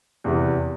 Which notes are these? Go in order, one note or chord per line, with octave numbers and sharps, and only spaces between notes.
E2 C3 E3